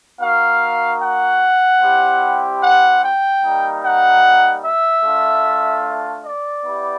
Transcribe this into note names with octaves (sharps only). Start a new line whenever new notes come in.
A#3 D#4 F#4 F5
F#5
G3 C4 E4 G4
F#5
G5
G3 A#3 D#4
F#5
E5
A3 D4 F4
D5
B3 E4 G4